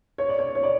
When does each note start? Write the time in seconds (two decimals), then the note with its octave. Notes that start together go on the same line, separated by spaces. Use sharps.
0.18 C#5
0.29 D5
0.39 C#5
0.55 C#5
0.63 D5